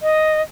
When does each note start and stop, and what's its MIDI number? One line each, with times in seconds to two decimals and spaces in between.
0.02 0.42 75